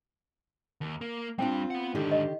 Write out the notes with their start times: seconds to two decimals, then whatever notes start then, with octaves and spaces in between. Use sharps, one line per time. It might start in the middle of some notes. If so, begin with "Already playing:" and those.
0.81 D#2
1.01 A#3
1.39 G3 C4 D4 F4 G5
1.71 B3 F#5
1.95 G#2 D3 D#3 D4 G4
2.11 D#5